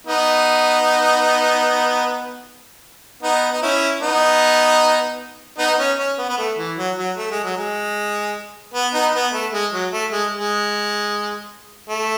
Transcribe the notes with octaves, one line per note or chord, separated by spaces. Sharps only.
B3 D#4
B3 D#4
D#4
C#4 E4
B3 D#4
B3 D#4
B3
C#4
C#4
B3
B3
A3
E3
F#3
F#3
A3
G#3
F#3
G#3
B3
B3 D#4
B3
A3
G#3
F#3
A3
G#3
G#3
A3